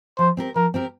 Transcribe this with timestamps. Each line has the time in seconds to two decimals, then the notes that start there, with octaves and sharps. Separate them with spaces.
0.18 F3 C5
0.37 C4 G4 A#4
0.56 F3 A#4
0.74 C4 G4 A#4